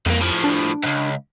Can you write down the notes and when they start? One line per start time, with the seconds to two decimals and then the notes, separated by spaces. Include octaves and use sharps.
0.06 C2 F2 A#3
0.21 A2 F3
0.44 D4
0.83 C#2 G#2